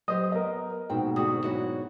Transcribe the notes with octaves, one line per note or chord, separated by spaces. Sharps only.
F#3 G4 C5 D#5 D#6
B3 A#4 D#5
D#2 G#2 B2 C4 G5
D2 F#4 G#4 D#6
F#3 E4 F#4